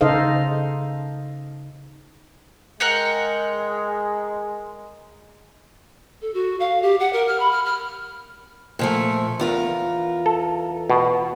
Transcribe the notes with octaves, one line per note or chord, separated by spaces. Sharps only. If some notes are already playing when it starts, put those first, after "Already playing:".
C#3 D#4 A4 C5 D#5 F5
G#3 A#4 F#5 G5
A4
F#4
F5
G4
F#5
A#4
F6
B5
F6
F6
A#2 F3 A3
E2 F4 A#4
A4
B2